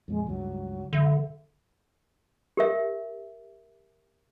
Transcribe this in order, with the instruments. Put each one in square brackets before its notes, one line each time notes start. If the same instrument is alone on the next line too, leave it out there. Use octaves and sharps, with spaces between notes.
[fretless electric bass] F2 A#2 [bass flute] G#3
[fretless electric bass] C#2 G2 [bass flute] F#3
[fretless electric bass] C#2 F#2 [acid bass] D3 [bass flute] E5
[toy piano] G4 A#4 E5